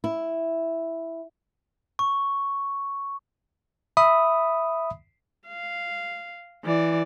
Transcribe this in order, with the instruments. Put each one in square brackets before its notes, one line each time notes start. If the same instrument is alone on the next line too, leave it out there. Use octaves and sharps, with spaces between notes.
[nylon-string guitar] E4
[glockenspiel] C#6
[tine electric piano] E5 B5 D#6
[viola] F5
E3 D5